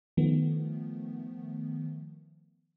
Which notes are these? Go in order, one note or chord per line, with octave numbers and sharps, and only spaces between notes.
D#3 F3 A3 B3